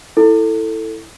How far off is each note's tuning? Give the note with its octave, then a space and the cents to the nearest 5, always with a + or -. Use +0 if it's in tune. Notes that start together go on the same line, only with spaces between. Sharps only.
E4 +0 A4 +10